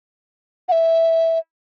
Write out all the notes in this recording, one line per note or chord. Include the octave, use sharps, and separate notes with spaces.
F#5
E5